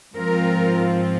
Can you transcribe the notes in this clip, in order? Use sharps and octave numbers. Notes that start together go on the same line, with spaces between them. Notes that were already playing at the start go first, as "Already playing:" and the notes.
G#2 F3 C4 F4 A#4